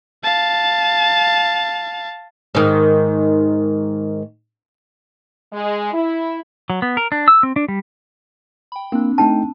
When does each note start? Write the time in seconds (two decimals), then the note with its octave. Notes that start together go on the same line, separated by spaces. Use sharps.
0.24 F5 A5
2.55 G#2 D#3
5.52 G#3
5.92 E4
6.70 F#3
6.82 B3
6.97 A#4
7.12 D4
7.28 E6
7.43 C4
7.56 D4
7.68 G3
8.72 G5 B5
8.92 A#3 C4 D4
9.18 A3 D#4 G5 A5